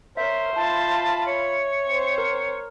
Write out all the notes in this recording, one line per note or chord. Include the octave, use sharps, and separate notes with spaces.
A#4 C5 C#5 E5 B6
F4 A5 B5
C#5 C#7
C4 C5
A#4